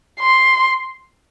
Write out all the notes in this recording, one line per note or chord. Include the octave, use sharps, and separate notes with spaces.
C6